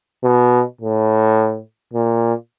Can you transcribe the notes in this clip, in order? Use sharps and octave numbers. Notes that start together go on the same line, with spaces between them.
B2
A2
A#2